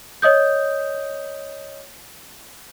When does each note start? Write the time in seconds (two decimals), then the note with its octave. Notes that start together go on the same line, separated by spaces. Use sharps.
0.22 C#5 D#5 D#6 G6